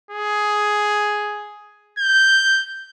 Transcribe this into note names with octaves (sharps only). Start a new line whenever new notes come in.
G#4
G6